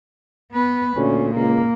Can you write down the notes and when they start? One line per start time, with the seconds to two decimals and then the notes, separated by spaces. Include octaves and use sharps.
0.52 B3 B4
0.96 D2 A#2 C#4
1.35 C#2 A#3